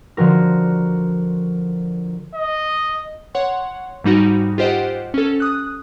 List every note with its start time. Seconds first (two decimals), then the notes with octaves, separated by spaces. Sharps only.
0.17 D3 F3 F#4 A#4
2.34 D#5
3.35 C#5 F#5 C6
4.04 G#2 G3 D#4 F#4
4.58 F4 G4 C5 D#5 F#5
5.14 C#4 A4
5.40 D#6 F#6